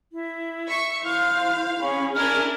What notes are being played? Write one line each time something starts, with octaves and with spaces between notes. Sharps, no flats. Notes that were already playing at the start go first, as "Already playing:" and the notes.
E4
E5 C#6
E4 C5 F5 F6
C#4 G#4 C#5 B5 C#6
D4 E4 A#4 G#5 F6 G#6